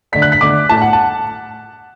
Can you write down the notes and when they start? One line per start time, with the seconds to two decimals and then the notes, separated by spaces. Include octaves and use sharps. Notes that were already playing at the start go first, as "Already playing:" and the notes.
0.12 D3 A3 D4 B6
0.22 F#6
0.32 B6
0.41 D3 A3 D4 D6
0.69 A2 A3 E4 A5
0.82 F#5
0.93 A5